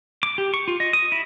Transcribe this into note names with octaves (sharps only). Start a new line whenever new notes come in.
D6
G4
C#6
F4
D#5
D#6
E4